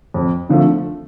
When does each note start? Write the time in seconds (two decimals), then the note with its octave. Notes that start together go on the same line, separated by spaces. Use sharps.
0.14 F2
0.49 D3 F3 A3